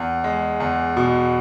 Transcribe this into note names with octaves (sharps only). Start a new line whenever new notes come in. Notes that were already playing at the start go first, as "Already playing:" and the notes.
Already playing: E2
G#3
E2
B2